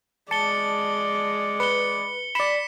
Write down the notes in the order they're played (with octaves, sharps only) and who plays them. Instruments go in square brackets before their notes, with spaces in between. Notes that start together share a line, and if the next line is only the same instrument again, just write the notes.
[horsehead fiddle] G#3 D5 [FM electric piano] A5 [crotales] C#7 G7
[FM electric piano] B4 [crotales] C#7 G7
[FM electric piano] D5 B5 [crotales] B6 C#7 E7